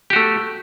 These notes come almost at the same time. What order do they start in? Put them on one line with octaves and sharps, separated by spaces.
G4 F#4 A3